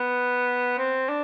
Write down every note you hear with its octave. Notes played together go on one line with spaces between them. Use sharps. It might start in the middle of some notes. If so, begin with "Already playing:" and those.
Already playing: B3
C4
D4